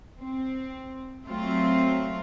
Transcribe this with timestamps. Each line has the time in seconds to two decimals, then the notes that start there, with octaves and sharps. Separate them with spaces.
0.19 C4
1.25 F#3 A3 C4 F4